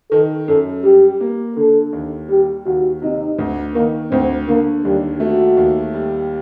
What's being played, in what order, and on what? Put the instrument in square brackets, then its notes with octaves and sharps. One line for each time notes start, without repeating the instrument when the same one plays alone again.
[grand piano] D#3 [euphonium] A4
[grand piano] F#2 [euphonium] A4
[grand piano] G3 [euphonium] G4
[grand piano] A#3
[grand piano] D3 [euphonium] A4
[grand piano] D#2
[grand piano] G3 [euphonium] G4
[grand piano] D#2 [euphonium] F#4
[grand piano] C3 [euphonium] D#4
[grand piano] D2
[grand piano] D#3 [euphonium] A#3
[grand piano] D2 [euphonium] C4
[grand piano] D3 [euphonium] A#3
[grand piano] D#2 [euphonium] G3
[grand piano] A3 [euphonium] F#4
[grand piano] D#2
G3